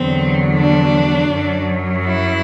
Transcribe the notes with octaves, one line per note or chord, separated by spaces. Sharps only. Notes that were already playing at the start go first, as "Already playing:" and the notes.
Already playing: E2 D3 F#3 C4
D4
F#2 F#3
E4